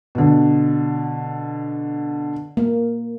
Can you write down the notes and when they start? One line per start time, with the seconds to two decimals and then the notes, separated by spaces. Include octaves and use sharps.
0.15 B2 D3
2.57 A#3